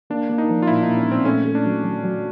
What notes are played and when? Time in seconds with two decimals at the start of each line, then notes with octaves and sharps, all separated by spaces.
0.10 A#3 D4
0.29 A#3
0.38 D#4
0.49 F3
0.62 F4
0.67 A#2 E4
0.83 D#4
0.87 A#2
0.97 C#4
1.06 A#2
1.12 C4
1.25 A3 C#4
1.45 A3
1.55 D4
1.65 F#3
1.83 F#3
2.03 F#3